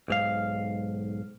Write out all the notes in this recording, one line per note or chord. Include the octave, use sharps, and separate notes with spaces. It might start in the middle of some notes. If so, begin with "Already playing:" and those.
B1 G#2 F5